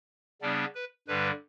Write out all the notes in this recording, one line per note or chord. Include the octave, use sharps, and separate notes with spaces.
C#3 G3 B3 D4 D5
B4
G2 D3 G3 B4